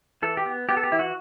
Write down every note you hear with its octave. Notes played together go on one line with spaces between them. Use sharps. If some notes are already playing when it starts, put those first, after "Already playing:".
E3 A4
G4
B3
B3 G4
A4
G4
E3 E4
F#4